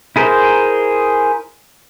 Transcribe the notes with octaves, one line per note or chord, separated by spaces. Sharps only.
E4 G#4 A#4 C5